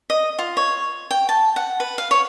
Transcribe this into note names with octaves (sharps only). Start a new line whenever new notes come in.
D#5
F4
C#5
G5
A5
F#5
B4
F5
C#5